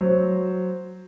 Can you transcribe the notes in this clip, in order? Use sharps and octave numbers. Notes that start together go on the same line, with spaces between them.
F#3 C5